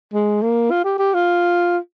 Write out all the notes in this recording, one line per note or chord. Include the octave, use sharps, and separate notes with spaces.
G#3
A#3
F4
G4
G4
F4